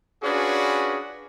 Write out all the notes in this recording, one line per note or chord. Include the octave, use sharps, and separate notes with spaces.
C#4 D4 F4 F#4 G#4 B4